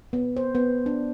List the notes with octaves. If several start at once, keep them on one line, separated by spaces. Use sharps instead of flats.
B3
C5
B3
D4